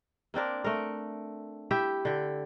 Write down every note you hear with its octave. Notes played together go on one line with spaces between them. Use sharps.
A#3 C4 D4 A#4
A3 A#4
E4 G4 E5
D3 G4